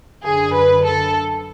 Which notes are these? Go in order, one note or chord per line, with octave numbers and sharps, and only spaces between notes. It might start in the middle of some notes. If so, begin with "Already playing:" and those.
F#2 D3 G#4
B4
A4